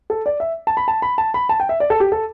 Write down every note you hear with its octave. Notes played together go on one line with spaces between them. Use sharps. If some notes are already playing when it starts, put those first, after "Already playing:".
A4
D5
E5
A5
B5
A5
B5
A5
B5
A5
G5
E5
D5
A4
G4
A4